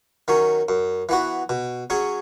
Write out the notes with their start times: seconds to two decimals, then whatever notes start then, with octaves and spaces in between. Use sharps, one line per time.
0.28 D#3 F#3 C#4
0.69 F#2
1.09 E3 B3 F#4
1.49 B2
1.90 F#3 C#4 G#4